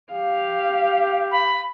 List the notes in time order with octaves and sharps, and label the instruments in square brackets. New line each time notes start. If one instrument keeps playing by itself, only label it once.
[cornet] G4 [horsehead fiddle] F5
[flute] B5